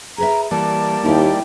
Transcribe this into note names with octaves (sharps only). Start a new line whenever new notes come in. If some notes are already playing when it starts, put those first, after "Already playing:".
G#4 B4 E5 A#5
E3 G3 A#3 D5 A5
D#2 D#4 E4 G4